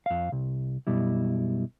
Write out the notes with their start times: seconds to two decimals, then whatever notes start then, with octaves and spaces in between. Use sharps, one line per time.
0.06 F2 F5
0.32 C2
0.87 F#2 B2 G3 E4